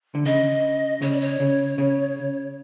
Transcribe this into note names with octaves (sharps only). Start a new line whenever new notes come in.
D3
C#3 D#5
C#3 C#5
D5
C#5
C#3
C#3